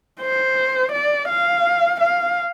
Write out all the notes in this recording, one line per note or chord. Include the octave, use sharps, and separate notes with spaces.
C5
D5
F5
F5